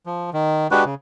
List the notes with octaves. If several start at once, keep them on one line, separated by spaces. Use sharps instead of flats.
F3
D#3
G#3 D4 F#4 G4 B4
C#3